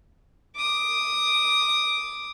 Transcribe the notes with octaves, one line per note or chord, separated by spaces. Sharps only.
D6 D#6